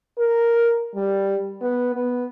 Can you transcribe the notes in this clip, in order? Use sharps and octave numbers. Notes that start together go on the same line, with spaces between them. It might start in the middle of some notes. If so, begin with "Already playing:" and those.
A#4
G3
B3
B3